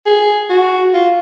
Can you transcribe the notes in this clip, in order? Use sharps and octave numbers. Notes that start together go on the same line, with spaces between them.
G#4
F#4
F4